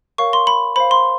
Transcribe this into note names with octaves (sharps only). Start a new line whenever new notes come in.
A#4 C#5 F5 C#6
C6
B5
C5 F5 B5
C6